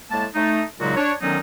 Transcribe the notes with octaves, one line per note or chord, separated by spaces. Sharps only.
A2 G#3 A#3 A5
A3 D#4
A#2 C#3 F#3 G#3 D#4 F#4
D4 C#5
D3 D#3 F#3 B3 C#4 D#4